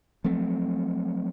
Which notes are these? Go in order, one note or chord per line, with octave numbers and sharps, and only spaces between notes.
F3 F#3 A3 C4